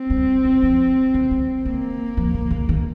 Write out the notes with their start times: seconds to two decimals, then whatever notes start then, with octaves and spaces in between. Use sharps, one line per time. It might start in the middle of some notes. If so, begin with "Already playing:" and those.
Already playing: C4
0.10 G3
0.45 G#3
0.63 F3
1.14 G#3
1.31 G3
1.65 G#3 A#3
2.17 F3
2.34 C#3
2.51 C#3
2.69 D#3